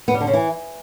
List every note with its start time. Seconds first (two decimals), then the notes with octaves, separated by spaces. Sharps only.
0.08 B3
0.14 G3
0.21 D3
0.27 C#3
0.33 E3